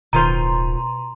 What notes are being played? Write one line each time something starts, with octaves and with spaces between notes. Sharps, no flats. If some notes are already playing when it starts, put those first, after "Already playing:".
D1 B2 D#3 F4 C5 A#5 C6